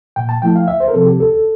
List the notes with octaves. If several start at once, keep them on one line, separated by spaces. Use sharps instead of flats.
A#2 G5
A5
F3 A3 E4 G5
F5
D2 E5
C5
A#4
C3 F3 C4 A4
G4
D2 A4